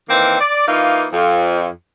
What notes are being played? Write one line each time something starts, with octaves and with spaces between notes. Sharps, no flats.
D#3 E3 A#3 C4
D5
E3 A#3 D#4 F4
F2